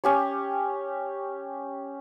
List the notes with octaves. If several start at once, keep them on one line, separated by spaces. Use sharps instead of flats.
C#4 G4 C#5